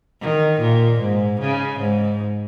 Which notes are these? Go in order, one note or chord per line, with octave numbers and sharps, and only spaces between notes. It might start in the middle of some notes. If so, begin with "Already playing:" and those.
D#3
A#2
G#2
C#3
G#2